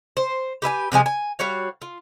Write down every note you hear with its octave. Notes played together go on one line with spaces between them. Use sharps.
C5
G4 B4 E5 G#5
C3 F3 G#3 G#5
G#5
G3 F#4 C#5 F5
F4